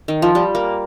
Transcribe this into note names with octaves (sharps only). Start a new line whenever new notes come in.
D#3
F3
G3
A#3